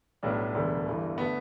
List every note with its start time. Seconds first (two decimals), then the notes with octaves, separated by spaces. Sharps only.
0.23 B1 A2 G3 B3 D4
0.54 E1 D2 D3 G3 B3
0.86 G1 G2 E3
1.18 D3 A3 B3